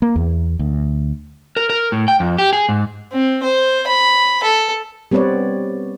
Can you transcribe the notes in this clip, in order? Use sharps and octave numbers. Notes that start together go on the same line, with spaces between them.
A#3
E2
D2
A#4
A#4
A2
G5
F2
G4
G#4
G#2
C4
C5
B5
A4
G3 B3 C4 B4 C#5 D5